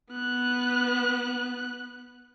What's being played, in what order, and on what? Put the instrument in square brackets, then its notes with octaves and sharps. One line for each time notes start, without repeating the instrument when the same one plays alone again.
[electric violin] B3 F#6